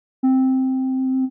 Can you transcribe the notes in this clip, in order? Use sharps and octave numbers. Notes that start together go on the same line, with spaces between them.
C4